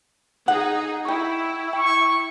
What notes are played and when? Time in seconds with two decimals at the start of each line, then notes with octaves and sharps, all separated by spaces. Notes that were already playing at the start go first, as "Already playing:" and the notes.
0.48 D#4 G#4 F#5
1.05 E4 G5 C#6
1.73 G5 C#6